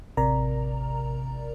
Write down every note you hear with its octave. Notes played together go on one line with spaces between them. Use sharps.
A1 C3 A#4 D5 A#5